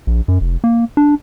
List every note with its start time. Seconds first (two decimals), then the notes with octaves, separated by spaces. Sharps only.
0.07 A#1
0.28 F#2
0.41 F1
0.64 A#3
0.97 D4